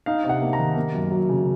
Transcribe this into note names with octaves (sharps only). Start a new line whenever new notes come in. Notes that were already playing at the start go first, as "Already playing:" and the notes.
D#4 F5
C3
F#5
A#3
A#5
D#3
A#3
F#2
F#3
C#3